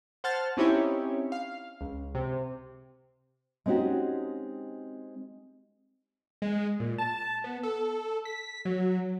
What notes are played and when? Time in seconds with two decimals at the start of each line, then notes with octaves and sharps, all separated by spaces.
0.24 C5 F#5 A5 F6 A6
0.57 C4 C#4 D#4 E4 G4 C#5
1.32 F5
1.81 C#2
2.15 C3
3.66 G#3 C4 C#4 D#4 F#4 G4
6.42 G#3
6.80 A#2
6.98 A5
7.44 B3
7.63 A4
8.25 B6
8.65 F#3